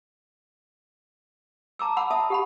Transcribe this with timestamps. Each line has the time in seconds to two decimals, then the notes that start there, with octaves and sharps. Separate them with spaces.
1.79 A5 A#5 D6 E6
1.97 F#5 B5 D6 E6
2.11 E5 A5 D#6
2.30 G4 F#5 B5